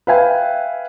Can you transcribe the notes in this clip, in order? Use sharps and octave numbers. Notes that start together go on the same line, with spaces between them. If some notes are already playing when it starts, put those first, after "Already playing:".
B4 E5 F5 G5 G#5